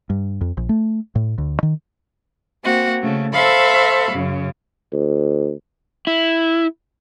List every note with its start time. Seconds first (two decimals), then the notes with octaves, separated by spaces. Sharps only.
0.10 G2
0.41 F2
0.57 A#1
0.69 A3
1.15 A2
1.38 D2
1.63 D#3
2.63 A#3 C4 F#4
3.01 C#3 A3
3.33 A4 C5 E5 F5 B5 C#6
4.11 F#2 C#3
4.93 D2
6.07 E4